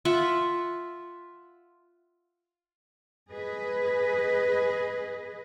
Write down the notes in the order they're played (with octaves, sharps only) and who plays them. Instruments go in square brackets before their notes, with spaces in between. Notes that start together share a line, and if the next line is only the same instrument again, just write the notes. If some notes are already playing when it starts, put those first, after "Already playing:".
[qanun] F4 E5 F#5
[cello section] G#4 B4 D#5